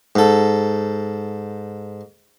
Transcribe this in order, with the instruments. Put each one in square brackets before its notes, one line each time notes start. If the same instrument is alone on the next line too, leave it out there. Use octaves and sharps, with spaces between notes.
[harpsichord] G#2 A4